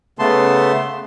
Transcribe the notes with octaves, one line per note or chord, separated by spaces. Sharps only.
C#3 A3 B3 A5 C6